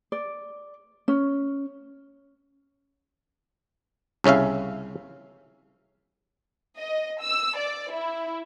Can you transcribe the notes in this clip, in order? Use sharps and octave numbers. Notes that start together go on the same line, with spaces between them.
D5
C#4
C2 C#3 C#4 E5 F5
D#5
E6
D5
E4